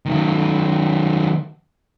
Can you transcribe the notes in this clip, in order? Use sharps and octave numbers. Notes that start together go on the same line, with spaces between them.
D#3 F#3